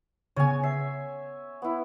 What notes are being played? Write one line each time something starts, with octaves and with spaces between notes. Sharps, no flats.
C#3 B3 C#5 G#5
E5 C7
B3 E4